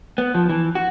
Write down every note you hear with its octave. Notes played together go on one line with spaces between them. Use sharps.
B3
F3
E3
F#4